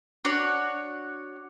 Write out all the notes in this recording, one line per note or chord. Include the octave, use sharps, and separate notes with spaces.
D4 F#4 C#5